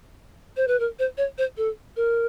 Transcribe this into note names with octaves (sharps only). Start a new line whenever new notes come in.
C5
B4
A#4
C5
C#5
C5
A4
A#4